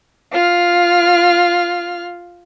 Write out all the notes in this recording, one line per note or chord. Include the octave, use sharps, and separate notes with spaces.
F4 F6